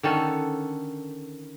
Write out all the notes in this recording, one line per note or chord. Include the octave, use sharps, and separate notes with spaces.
D3 D#3 C#4 A4